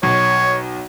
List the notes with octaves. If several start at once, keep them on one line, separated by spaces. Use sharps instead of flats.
B1 C#5